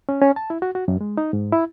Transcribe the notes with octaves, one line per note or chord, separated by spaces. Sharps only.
C#4
C#4
A5
E4
F#4
F#4
F#2
G#3
D#4
G#2
E4